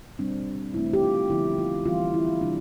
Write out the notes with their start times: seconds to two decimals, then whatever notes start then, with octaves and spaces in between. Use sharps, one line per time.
0.19 B2 G3 C4 D4
0.74 C3 E3 A3 C4 E4
0.93 G4
1.03 F4
1.30 D3 F3 B3 E4
1.59 F4
1.86 E3 G3 C4 F4
2.14 E4
2.41 C3 E3 G3 D4